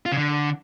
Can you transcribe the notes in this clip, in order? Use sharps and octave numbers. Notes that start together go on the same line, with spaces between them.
F4
C#3
D3